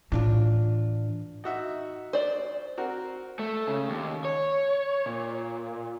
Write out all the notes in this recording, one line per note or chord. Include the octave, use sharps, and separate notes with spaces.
A2 E3 D4 F4
D#4 F#4 E5
C5 D5
C4 F#4 A#4
A3
C#3
D#2
C#5
A#2